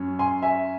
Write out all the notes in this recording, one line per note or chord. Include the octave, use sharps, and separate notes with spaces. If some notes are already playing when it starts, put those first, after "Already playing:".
Already playing: F#2 C#4
G#5 C6
E5 G#5